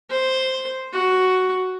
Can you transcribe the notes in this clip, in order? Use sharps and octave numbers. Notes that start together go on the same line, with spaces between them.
C5
F#4